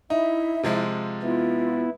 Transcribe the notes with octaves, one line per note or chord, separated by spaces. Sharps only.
D#4 E4 E5
C3 F3 G#3
B3 E4 F4